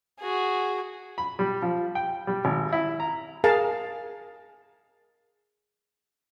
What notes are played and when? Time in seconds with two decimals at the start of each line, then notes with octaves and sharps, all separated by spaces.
0.20 F#4 G#4
1.18 B5
1.39 G3
1.62 F3
1.95 G5
2.27 G3
2.45 G#1
2.73 E4
3.00 A#5
3.44 G#4 A#4 F5 A5